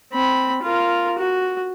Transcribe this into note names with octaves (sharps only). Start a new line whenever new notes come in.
C4 B5
F4 A#4
F#4